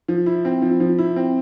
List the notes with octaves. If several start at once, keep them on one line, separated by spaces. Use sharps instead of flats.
F3
E4
C4
F3
F3
E4
C4